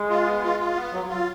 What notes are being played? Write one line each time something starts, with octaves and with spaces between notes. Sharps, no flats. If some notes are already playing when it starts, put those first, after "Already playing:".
Already playing: G#3
F4
B3
F4
F4
B3
F#3
F4